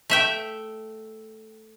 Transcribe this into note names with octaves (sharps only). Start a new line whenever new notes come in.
A3 E5 G5